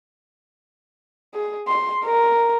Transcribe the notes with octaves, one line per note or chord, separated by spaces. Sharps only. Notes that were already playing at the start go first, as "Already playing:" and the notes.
G#4
C6
A#4